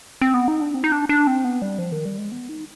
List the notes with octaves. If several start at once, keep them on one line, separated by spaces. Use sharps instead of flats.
C4
B3
D#4
D4
C4
D#4
D4
D4
C4
B3
G3
F3
D#3
G3
G#3
B3
D#4